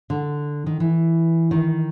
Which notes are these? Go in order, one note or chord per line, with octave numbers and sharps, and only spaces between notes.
D3
D#3
E3
D#3